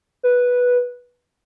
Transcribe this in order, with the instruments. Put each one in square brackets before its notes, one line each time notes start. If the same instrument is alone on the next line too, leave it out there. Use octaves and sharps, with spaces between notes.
[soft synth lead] B4